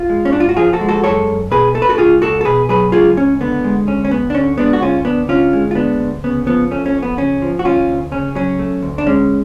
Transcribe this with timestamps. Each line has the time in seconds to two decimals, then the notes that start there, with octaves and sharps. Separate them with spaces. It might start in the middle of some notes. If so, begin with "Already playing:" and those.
Already playing: F4
0.10 G#3
0.25 C#4
0.33 G#2 D4
0.40 F4
0.49 F#4
0.57 F3 F4 G#4
0.73 F#4 A4
0.81 G#3
0.88 F#4 A4
1.04 F#2 A4 C#5
1.27 F#2
1.51 B2 G#4 B4
1.74 A3 A4
1.82 B4
1.89 F#4 A4
1.98 C#2 F4 G#4
2.22 C#2 F#4 A4
2.41 A4
2.45 B2 G#4 B4
2.69 F#3 G#4 B4
2.92 C#2 F4 G#4
3.17 C#2 C#4
3.41 D3 B3
3.64 G#3
3.87 D2 C#4
4.05 C#4
4.11 D2 B3
4.30 D4
4.34 D3 C#4
4.58 G#3 B3 D4
4.73 F#4
4.82 D2 C#4 F4
5.05 D2 B3 D4
5.28 D3 C#4 F4
5.53 G#3
5.71 F4
5.75 D2 B3 D4
5.99 D2
6.24 C#3 B3
6.46 F3 B3
6.71 A3 C#4
6.86 C#4
6.95 F2
7.03 B3
7.17 C#3 C#4
7.42 F3
7.59 F#4
7.64 D2 C#4 F4
7.89 D2
8.12 C#3 C#4
8.35 F#3 C#4
8.59 A3
8.82 D2
8.98 D4
9.07 G#3 C#4